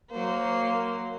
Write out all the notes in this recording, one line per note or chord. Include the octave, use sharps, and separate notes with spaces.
F#3 A#3 C5